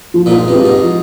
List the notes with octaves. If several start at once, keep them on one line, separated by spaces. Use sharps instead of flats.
F3
A#2
G#2
G2 C4 F4 G#4
G#2
F3